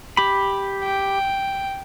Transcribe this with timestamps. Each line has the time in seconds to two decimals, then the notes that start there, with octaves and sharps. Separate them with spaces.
0.17 G4 B5
0.84 G5